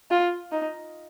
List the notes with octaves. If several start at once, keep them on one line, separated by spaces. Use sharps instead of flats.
F4
D#4